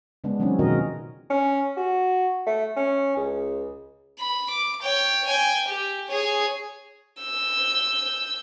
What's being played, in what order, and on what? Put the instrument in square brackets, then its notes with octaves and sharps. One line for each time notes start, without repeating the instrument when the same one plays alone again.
[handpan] C#3 G#3 B3 D4
C#3 E3 F#3 C4 C#4 D#4
B2 D#3 F3 F#4 A#4 D#5
[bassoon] C#4
F#4
A3
C#4
C#2
[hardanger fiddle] B5
D6
C#5 G5
G5 G#5
G4
G#4 C#5
[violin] E6 G6